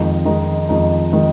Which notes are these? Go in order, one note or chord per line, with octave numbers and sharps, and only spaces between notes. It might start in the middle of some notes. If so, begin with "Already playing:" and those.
Already playing: F2 D#3 G#3 D#4
F2 D#3 G#3 D#4
F2 D#3 G#3 D#4
D#3 G#3 D#4